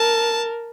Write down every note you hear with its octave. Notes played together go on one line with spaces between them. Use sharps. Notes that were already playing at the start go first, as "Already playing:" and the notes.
Already playing: A#4 A5